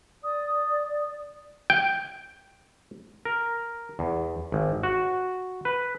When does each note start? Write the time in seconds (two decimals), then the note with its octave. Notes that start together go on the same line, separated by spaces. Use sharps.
0.24 D5 D#6
1.70 G5
3.25 A#4
3.99 E2
4.52 G#1
4.83 F#4
5.65 B4